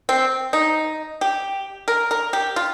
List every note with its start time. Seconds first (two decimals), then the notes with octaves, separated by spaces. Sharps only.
0.09 C4
0.53 D#4
1.21 G4
1.88 A#4
2.11 A#4
2.33 G4
2.56 F4